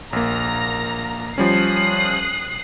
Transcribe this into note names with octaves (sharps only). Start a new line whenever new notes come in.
A#1 A#3 A#5
F3 G3 C#4 D#6 F#6 C7